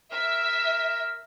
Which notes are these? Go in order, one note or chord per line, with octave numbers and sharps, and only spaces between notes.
A#4 E5